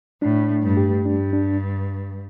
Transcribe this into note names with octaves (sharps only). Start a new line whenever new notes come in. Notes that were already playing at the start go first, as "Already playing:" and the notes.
A2 D4
A3
G2
G4
G2 D4
D4